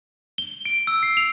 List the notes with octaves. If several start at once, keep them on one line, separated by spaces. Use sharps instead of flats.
G7
D7
E6
C7
F7